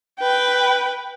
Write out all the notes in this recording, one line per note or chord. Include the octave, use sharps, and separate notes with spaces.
B4 G5